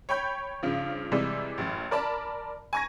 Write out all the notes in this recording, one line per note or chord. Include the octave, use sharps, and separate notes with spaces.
C#5 G5 B5 G6
G2 C#3 F3
C3 E3 G3 G#3
A1 F#2
A#4 D5 A5 B5
G#5 A#5 C#6 G#6 A#6